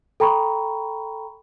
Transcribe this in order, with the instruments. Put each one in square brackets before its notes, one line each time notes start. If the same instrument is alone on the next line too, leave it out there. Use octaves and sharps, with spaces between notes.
[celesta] A4 G5 A#5 B5 C#6